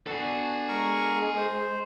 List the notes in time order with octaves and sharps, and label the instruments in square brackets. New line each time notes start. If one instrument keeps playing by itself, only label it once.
[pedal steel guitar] B3 D4 F#4 [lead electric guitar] A4 G#5
[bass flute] G#3 [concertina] A#4 C#6
[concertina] C5